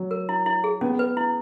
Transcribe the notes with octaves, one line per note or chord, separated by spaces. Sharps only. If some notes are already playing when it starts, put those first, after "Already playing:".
Already playing: F#3
A#4
E4
E4
G#4
B3 C#4
B4
E4